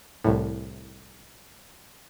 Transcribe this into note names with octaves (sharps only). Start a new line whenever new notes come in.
C2 A2